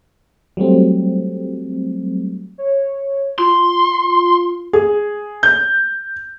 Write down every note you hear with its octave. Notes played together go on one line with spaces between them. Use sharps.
F#3 G3 A3 C4
C#5
F4 C6
G#4
G6